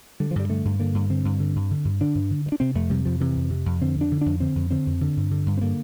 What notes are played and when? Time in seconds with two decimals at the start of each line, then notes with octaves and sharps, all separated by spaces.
0.20 D3 G3
0.31 F3
0.36 G2 G3
0.50 D3 A3
0.65 G2
0.80 D3 A#3
0.95 G2
1.10 D3 C4
1.25 G2
1.40 D3
1.56 G2
1.71 D3
1.85 G2
2.01 D3 D4
2.15 G2
2.30 D3
2.46 G2
2.52 D4
2.60 C3 C4
2.75 F2 A3
2.90 C3 G3
3.05 F2 F3
3.20 C3 E3
3.36 F2
3.50 C3
3.66 F2
3.81 D3 C4
3.96 F2
4.01 D4
4.11 D3
4.21 F2 D4
4.40 D3 C4
4.56 F2
4.71 D3 C4
4.86 F2
5.01 D3
5.17 G2
5.31 D3
5.47 G2
5.57 C4
5.61 D3 A#3